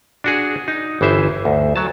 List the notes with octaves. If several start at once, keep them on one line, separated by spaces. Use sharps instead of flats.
D4 F#4 G#4
D#4
G1 E3 C5 E5
D2
F#3 A5